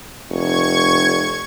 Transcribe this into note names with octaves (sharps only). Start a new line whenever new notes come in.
F1 C#6 G#6